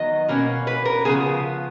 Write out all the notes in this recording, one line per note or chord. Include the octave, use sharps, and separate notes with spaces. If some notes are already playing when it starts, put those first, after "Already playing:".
Already playing: D#3 F#3 B3 D#5
B2 A#3 C#4
B4
A#4
C#3 F3 B3 G#4